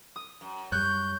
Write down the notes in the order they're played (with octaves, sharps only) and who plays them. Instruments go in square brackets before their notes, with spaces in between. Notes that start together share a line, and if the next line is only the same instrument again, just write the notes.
[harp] D#6
[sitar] F#2
[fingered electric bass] F#2 G3 [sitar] C#5 [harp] F#6 [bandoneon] G6